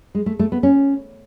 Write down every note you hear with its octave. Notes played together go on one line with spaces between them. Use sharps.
G#3
A3
A3
B3
C#4